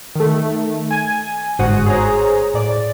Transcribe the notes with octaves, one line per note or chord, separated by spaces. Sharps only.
D#3 A3
G#5
G1 G#2 F#4 C5 F#5 D#6
G#4 C5 C#5 A#5
A2 D5